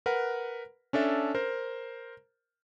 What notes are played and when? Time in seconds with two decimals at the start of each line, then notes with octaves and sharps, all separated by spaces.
0.06 A#4 B4 F#5
0.93 C#4 D4 A4 E5
1.35 A#4 C5